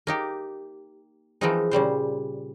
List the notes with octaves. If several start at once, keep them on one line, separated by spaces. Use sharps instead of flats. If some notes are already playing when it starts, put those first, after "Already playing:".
A#3 D#4 G4
E3 F3 G#3 A#3 C4 D#4
A#2 C#3 G3 C5